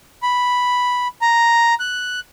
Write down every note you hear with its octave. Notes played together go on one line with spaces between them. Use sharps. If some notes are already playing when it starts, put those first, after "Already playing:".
B5
A#5
F#6